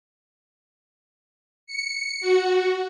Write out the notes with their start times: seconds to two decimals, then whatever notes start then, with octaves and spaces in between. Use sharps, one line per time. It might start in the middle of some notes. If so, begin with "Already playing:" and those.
1.66 C#7
2.21 F#4